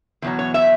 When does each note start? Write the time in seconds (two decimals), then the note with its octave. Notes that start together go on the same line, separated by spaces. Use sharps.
0.22 E2 B2 F#3
0.39 C#5
0.54 E5